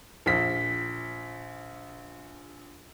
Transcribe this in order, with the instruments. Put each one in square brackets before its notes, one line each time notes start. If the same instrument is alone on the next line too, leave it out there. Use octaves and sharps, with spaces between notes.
[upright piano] A#1 B6